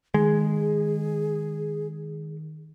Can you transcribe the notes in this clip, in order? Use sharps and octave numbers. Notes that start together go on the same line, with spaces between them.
D#3 G#3 G#4